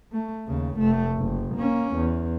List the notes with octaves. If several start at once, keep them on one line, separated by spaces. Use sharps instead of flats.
A3
D#2 C#3
F1 A3
F#1
A#3 C#4
E2